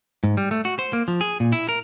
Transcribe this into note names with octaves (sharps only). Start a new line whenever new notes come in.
G#2
G3
A3
F#4
C5
A#3
F3
G#4
A#2
E4
A#4